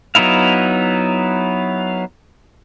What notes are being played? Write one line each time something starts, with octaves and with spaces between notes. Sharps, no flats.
F#3 B3 D#4 E4 F5